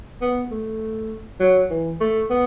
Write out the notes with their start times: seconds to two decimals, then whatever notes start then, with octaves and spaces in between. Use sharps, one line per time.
0.21 B3
0.51 A3
1.40 F#3
1.70 E3
2.00 A3
2.30 B3